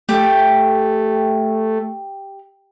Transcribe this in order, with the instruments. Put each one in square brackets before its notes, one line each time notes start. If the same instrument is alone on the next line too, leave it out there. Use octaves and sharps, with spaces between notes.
[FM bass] A3 [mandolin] G4